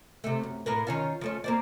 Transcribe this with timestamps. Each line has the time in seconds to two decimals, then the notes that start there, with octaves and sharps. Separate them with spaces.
0.24 C3 A3
0.43 F#2
0.66 A2 A#4 B4
0.87 D#3 C#4 F4
1.21 F3 A3 C#4
1.44 A#3 C4 D5